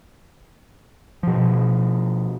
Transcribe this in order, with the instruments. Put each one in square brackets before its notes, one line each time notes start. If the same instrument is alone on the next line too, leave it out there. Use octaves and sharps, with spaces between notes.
[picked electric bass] B2 F3